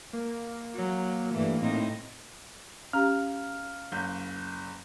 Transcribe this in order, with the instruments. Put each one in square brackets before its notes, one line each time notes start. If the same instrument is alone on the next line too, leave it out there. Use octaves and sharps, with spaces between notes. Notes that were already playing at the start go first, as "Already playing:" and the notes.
[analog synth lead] A#3
[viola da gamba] F#3
G2 E3 A3
A2 C4 D#4
[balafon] C#4 G4 [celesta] F5 A#5 [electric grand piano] F6
[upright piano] F#1 G6